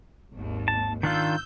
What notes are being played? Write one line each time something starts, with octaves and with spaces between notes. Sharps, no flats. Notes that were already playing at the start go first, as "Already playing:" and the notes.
G#1 D#2
A5
D#3 D4 F4 E6 G6